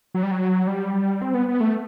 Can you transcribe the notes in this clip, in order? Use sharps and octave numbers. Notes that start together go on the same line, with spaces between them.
F#3
G3
F#3
G3
C4
B3
B3
A3